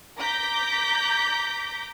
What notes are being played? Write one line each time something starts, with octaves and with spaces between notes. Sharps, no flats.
A#5 D6 G6 A#6 B6